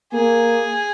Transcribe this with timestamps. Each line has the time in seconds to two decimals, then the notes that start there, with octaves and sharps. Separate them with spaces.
0.14 A#3 G#4